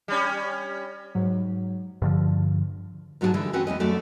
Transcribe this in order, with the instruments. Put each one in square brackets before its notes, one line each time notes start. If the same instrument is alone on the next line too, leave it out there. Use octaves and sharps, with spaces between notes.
[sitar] G3 C#4
[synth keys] G#2 F#3
[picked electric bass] G2 D3 F3
[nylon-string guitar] G#2 F#3 G#3 F#4 G#4 A5
D3 E3 G#3
C4 C#4 F#4 B4 F#5
E2 G#3 D#5
F#2 A3 F#4 A4 D5